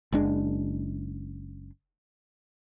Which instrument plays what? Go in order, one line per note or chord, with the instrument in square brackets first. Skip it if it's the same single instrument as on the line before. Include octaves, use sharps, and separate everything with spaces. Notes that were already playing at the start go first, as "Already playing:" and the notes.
[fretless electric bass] F#1 G#3 D4